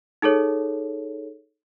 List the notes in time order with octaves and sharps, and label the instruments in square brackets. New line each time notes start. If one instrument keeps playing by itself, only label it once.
[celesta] D#4 G#4 A4 C#5